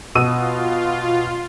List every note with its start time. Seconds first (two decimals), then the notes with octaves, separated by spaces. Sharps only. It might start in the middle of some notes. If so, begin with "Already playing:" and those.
0.15 B2 F4 E6 D#7